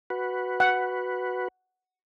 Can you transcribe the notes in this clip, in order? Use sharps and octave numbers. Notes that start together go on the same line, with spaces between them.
F#4 B4
F#5